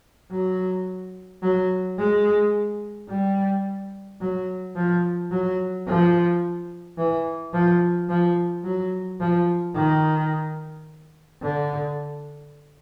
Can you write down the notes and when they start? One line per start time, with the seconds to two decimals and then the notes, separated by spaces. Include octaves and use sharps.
0.31 F#3
1.42 F#3
1.98 G#3
3.09 G3
4.20 F#3
4.76 F3
5.31 F#3
5.87 F3
6.98 E3
7.53 F3
8.09 F3
8.64 F#3
9.20 F3
9.75 D#3
11.42 D3